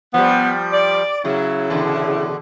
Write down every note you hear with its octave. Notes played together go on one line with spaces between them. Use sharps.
F3 G3 B3
D5
C#3 F#3 E4
E2 B2 D3